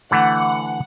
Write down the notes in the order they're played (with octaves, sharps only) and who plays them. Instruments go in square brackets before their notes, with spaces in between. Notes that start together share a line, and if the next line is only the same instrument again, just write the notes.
[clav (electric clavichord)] D3 E3 A3 [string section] F#5